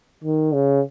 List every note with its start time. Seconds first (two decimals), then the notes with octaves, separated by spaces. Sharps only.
0.24 D#3
0.54 C#3